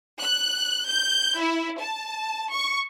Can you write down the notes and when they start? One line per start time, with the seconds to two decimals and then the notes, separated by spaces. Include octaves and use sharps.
0.21 F#6
0.88 G6
1.40 E4
1.79 A5
2.51 C#6